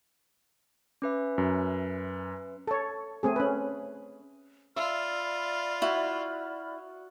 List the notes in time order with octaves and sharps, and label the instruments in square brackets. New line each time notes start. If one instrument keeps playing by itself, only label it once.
[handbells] C#4 B4 E5
[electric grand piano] F#2
[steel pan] A4 C#5
A3 C4 G#4
C#4 B4
[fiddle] F4 [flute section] D5 B5 F6 [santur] E5
[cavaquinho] E4 [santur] F#4